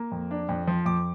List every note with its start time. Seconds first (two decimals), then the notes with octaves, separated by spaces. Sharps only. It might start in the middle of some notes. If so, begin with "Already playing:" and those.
Already playing: A#3
0.12 F2
0.31 D4
0.49 F2
0.68 F3
0.86 F2 D6